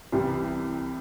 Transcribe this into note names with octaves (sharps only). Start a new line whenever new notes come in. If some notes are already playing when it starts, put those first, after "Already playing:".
C2 C3 E3 G3